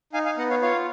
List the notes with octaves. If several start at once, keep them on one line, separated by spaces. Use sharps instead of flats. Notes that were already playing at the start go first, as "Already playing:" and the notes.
D#4 F5 G#5
F5 G#5
B3 D#5 F#5
C#5 F5
F4 C#5 F5